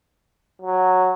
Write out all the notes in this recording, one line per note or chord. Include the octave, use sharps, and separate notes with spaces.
F#3